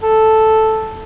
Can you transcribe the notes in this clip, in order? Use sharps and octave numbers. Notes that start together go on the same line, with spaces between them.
A4